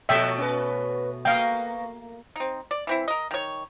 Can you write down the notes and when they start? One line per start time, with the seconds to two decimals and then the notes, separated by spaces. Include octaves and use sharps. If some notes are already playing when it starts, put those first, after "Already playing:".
0.09 B2 F3 A3 F#4 E5 G5
0.37 C#4 F#4 B4
1.25 A#3 B3 F#4 D#5 F5 G5
2.36 C4 D#4
2.71 D5
2.87 E3 C4 E4
3.08 A#4 D#5
3.31 D#3 C#5